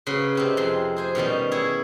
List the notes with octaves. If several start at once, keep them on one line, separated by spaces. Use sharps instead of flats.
C#3 F#3 B4 C6
C3 C4 D#4
F2 G#3 C6
G#4 C5 G#5
B2 D#3 G3 C#4
E4 G#4 C#5